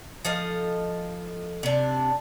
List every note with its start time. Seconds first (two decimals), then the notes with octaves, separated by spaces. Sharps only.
0.25 F3 A4 D#5 F5
1.63 C3 D4